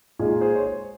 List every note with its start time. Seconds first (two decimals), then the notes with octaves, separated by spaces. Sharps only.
0.19 A#2 G#3 D#4 F4 G#4
0.41 G#4 C5
0.55 C#5
0.63 G#4 C5